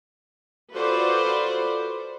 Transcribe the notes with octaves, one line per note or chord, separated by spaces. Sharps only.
F4 F#4 A4 B4 C5 D5